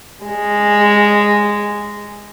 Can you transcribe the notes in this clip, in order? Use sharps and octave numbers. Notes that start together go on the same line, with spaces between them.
G#3